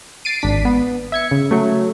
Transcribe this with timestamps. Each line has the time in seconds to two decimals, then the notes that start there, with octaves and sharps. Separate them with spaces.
0.25 A6 C7 D7 D#7
0.42 G#1 D4 B6
0.65 B3
1.12 E5 G#6 C#7
1.31 C#3
1.51 F#3 A3